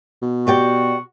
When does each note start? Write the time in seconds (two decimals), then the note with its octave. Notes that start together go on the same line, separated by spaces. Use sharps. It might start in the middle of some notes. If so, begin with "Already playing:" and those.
0.22 B2
0.47 F#4 G4 D5 G5